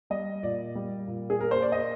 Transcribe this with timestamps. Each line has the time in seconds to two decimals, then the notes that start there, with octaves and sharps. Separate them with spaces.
0.10 G3 D#5
0.43 A#2 D5
0.75 G3
1.07 A#2
1.30 G#4
1.40 A#3 A#4
1.51 C5
1.62 D5
1.72 A#3 D#5